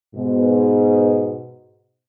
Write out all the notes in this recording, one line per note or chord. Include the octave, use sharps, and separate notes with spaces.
G#2 B2